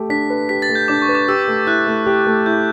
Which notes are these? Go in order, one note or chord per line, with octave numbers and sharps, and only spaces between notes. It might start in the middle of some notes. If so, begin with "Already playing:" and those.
Already playing: A3 G4
D4 B6
B4
G4 B6
A6
A3
G6
D4 D6
C#6
B4
D6
G4 E6
A3
E4 F#6
A3
G4
A3
E4 G6